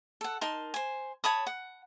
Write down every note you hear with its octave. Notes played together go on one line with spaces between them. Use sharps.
A4 F#5
D#4 A#4 A5 C6
C5 G#5
C#5 A5 B5 D#6
F#5